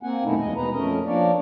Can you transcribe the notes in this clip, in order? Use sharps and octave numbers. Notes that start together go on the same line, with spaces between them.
A#3 C4 F#5 G#5
F#2 B2 D#3 A3 D#4 E4
E2 G#3 D#5
B2 D#4 B4 A#5
F2 A3 C#4 A#4 D#5
F3 A#3 D4 A#4 C#5 D5